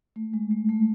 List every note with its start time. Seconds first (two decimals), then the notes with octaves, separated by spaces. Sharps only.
0.16 A3
0.33 G#3
0.51 A3
0.69 A3